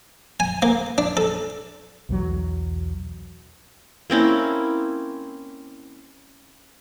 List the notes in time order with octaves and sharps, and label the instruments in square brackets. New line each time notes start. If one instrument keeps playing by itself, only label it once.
[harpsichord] G#5
A#3
D4
A4
[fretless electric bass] B1 E2 F#3
[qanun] A#3 C4 C#4 E4